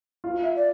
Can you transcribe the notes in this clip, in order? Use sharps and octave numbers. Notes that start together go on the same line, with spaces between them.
F4
E5
D5